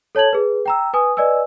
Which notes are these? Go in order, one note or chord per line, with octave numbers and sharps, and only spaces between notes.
A4 C#5 A5 G#6 F#7
G#4 B4
G5 A#5 E6
B4 G#5 D#6
B4 D5 D#5 G#5 E6